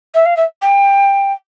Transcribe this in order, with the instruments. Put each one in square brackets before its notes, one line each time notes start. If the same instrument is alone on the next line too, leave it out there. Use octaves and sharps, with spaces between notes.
[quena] E5
F5
E5
G5